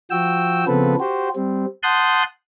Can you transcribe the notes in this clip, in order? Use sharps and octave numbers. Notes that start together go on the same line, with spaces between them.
F3 F#4 G5 E6
C#3 F3 B3 C4 A4 B4
F#4 G4 C5
G3 C4
F#5 A5 C6 D#6 F#6 G6